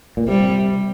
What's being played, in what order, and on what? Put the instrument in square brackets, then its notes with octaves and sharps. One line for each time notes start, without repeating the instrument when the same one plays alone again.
[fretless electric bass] A#2
[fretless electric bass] C3 [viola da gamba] G3